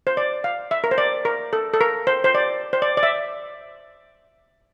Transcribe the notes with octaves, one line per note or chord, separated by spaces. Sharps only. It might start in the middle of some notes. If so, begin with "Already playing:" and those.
C5
D5
F5
E5
A#4
C5
D5
A#4
A4
A4
A#4
C5
C5
D5
C5
D5
D5
E5